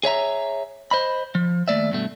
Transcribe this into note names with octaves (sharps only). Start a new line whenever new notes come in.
G#4 C#5 E5 A#5
C5 D#5 B5
F3
D#2 A3 D5 E5
G2 B2 A3